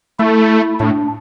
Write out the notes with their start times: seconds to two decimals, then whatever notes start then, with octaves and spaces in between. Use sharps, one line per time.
0.19 A3 E4
0.80 A2 D4